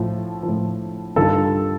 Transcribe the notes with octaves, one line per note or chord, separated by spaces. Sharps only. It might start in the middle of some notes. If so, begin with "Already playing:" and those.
Already playing: A2 F3
F3
A2
G2 D#3 G3 F4 A4